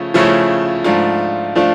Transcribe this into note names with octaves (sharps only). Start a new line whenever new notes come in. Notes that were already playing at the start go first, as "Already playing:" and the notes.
Already playing: C#3 F3 A3 C#4
C#3 F3 A3 C#4 E4
G#2 F3 A3 D4 F4
F3 A3 D4 F4